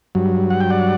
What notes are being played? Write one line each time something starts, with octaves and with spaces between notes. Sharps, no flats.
G2 F#3
F#5
G5
D5 F#5